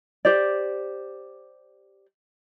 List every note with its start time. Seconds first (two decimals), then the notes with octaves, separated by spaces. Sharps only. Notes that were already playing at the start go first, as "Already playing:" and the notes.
0.25 G4 C5 D5